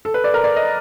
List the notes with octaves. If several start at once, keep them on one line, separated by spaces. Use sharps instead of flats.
A4
B4
D5
A#4
D5
D#5